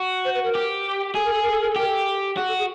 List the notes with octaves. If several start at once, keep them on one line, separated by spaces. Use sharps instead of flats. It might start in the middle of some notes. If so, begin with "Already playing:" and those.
Already playing: F#4
C5
B4
A#4
G4
G#4 A4
A#4
A4
A#4
A4
A#4
A4
G4 A#4
A4
F#4 G#4
A4
G#4